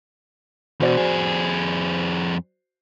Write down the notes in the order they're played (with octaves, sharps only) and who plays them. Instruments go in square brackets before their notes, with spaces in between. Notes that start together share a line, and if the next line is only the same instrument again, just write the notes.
[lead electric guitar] E2 B2 [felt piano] F#4 C5 D5
[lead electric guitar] F2 G#4